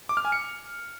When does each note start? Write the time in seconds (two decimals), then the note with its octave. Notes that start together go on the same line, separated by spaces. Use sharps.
0.09 D6
0.17 F6
0.25 G#5
0.32 C#7